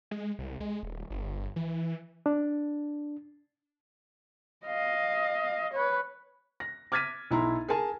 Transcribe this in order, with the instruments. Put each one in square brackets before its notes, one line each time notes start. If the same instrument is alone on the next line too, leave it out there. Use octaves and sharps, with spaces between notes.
[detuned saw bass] G#3
C2
G#3
D#1
G1
E3
[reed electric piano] D4
[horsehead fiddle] D#5 F5
B4 C#5
[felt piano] A#6
D6 F6 G#6 A6 B6 D#7
B1 E4 A#5 C6
G#4 A#4 G#5 A5